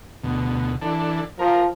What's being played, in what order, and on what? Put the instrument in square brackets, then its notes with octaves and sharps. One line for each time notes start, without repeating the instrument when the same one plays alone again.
[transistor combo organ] D2 B2
E3 D4 A4
[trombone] F3 [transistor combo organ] A#4